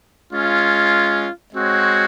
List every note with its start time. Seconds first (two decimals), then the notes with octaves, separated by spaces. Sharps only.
0.32 G#3 C#4 F4
1.54 G#3 C4 F#4 C#5